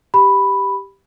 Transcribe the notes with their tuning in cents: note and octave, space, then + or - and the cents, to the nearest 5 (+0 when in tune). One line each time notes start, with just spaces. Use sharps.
G4 +0 B5 +0